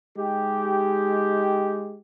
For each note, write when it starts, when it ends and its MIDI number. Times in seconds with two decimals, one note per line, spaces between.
0.17 1.98 56
0.17 1.98 63
0.17 1.98 67